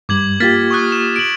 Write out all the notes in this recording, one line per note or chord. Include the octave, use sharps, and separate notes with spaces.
G2 G3 D6 G#6 F#7
A#3 F4 G4 F6 A6 B6
C#6 D#6 F#6
E7
D7 F#7